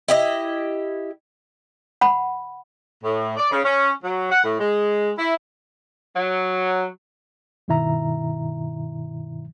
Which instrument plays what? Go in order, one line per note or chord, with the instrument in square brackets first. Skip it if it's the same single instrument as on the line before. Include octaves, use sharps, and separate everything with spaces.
[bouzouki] E4 G4 D#5
[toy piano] F#5 B5
[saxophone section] A2
D5
C#3
C#4
F#3
F#5
A2
G#3
E4
[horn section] F#3
[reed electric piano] G2 B2 D#3 E4 E5 A#5